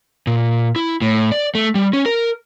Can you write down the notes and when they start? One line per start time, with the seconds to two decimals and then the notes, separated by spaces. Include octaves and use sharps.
0.27 A#2
0.76 E4
1.02 A2
1.32 D5
1.55 A3
1.75 G3
1.93 C#4
2.06 A#4